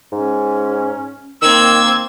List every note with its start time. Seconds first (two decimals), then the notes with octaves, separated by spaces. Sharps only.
0.12 G#2 C#4
1.42 D#3 A#3 C4 E6 G#6